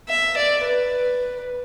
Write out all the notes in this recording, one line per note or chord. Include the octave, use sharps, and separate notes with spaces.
E5
D5
B4